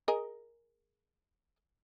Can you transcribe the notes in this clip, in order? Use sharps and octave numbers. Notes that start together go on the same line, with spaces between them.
G#4 A#4 D#5